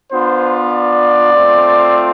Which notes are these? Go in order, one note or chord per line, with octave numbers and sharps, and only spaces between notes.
B3 D4 F4 C5
D5
A3 C4 F4